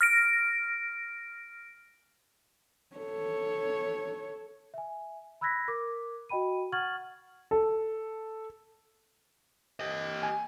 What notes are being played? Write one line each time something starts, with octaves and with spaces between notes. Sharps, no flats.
F6 A#6 D7
A4 C#5
E5 G#5
B5 E6 F#6 G#6 A#6 B6
A#4 D6
F#4 D#5 G5 B5 D#7
F#5 C#6 F6 G#6 A6 F#7
A4
G4 D#5
G#5